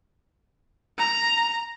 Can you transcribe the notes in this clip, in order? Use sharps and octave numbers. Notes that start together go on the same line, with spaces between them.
A#5